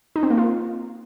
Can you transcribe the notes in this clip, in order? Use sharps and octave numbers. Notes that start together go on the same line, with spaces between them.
D#4
C4
A#3
F4